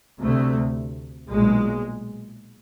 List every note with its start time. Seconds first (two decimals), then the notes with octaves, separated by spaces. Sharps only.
0.21 D2 C3 A3
1.29 B1 A#2 G#3